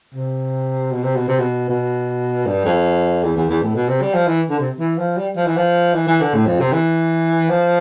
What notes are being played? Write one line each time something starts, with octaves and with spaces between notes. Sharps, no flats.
C3
B2
C3
B2
C3
B2
B2
G2
F2
E2
E2
E2
A2
B2
C3
G3
F3
E3
D3
C3
E3
F3
G3
F3
E3
F3
E3
E3
D3
A2
F2
C3
E3
F3